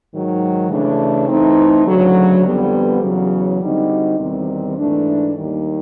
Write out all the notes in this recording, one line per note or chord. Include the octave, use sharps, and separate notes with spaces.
G#2 D#3 F#3
C#3 E3 A3 D4
E3 A3 C4 D#4
D2 C#3 F#3
F2 D3 G3 B3
E2 C#3 F#3
D3 G3 C4 D#4 F#4
E2 C3 D#3 G3 C4
G#2 E3 A3 D4
D#2 D#3 G3